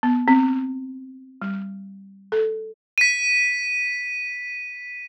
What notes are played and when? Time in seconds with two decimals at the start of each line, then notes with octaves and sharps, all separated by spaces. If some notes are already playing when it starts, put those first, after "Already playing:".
0.03 B3
0.28 C4
1.42 G3
2.32 A4
2.98 B6 D#7